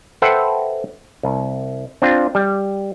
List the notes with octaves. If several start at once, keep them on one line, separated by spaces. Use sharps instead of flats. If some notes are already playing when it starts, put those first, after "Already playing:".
A4 B4 C5 E5 F#5 G5
C2
C4 D4 F4
G3